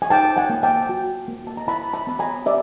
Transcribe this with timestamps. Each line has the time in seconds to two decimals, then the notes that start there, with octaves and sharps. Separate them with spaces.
0.02 G#5
0.10 D#4 G5 A5
0.37 F#5 G#5
0.50 A#3
0.63 G5 A5
0.89 F#4
1.28 A#3
1.47 A5
1.57 A#5
1.67 E4 A5 B5
1.93 A5 B5
2.07 B3 B5
2.19 G#5 A#5
2.46 G4 D5 E5